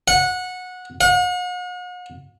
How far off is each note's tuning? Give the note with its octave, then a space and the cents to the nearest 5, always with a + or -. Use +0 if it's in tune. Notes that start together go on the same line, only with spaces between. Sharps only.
F#5 -20
F#5 -45